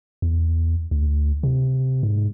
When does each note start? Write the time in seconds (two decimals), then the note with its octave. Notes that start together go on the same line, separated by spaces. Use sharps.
0.22 E2
0.91 D2
1.43 C3
2.03 G#2